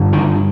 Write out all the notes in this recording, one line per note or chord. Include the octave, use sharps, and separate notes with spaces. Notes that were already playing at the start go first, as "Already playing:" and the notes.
Already playing: G2 D3
D#3